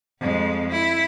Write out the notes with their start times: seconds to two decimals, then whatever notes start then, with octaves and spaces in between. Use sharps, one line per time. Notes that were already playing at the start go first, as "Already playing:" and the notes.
0.20 F2 G#3
0.70 E4